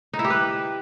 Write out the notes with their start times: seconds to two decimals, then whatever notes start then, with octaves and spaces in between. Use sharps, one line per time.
0.13 D#4
0.19 E4
0.25 G4
0.30 B4